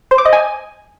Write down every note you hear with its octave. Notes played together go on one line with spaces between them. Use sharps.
C5
D6
D#5
G#5